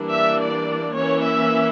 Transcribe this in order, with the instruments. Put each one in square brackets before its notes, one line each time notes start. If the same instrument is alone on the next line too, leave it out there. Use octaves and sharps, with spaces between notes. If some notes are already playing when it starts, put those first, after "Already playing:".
Already playing: [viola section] E3 G3 A#3 D4
E5
D5
E3 A#3 C#4 C#5
E5